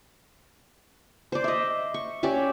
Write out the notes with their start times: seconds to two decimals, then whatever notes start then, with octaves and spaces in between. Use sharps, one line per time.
1.32 C5 D5
1.44 D#5 E5
1.94 C#6
2.23 C#4 G4 D5 E5